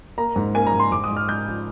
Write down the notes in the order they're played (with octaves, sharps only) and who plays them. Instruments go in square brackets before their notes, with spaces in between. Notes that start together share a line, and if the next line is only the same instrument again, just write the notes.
[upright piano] A#3 A#5
G#2
A#3 G#5
A#5
G#2
C6
G#2 D6
D#6
G#2
F6
G#2 G6
F3